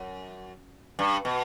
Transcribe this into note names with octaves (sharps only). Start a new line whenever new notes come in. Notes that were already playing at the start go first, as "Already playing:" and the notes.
Already playing: F#2
G2
B2